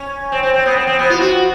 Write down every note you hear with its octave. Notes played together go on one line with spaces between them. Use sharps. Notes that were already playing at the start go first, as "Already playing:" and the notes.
Already playing: C#4
C4
C4
C4
B3
C4
C4
B3
F4
F#4